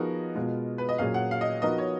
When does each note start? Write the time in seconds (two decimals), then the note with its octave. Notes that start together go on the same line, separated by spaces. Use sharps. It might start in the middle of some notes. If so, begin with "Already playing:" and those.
Already playing: F3 B3 D#4 F#4 G#4 A#4
0.35 B2 G#3 B3 F4
0.78 B4
0.89 D#5
0.98 A#2 F#3 C#4 G#4 F5
1.14 F#5
1.31 F5
1.41 D#5
1.62 F3 B3 D#4 F#4 A#4 D#5
1.78 C#5